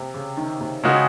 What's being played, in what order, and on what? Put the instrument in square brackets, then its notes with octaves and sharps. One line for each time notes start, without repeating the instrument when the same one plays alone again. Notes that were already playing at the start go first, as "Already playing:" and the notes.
Already playing: [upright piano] C3
C#3
D#3
C3
[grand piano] C#3 G#3 D#4 F#4